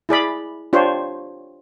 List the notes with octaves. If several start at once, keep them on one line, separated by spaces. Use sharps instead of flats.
E4 G#4 D5 B5
D4 F4 G4 C5 C#5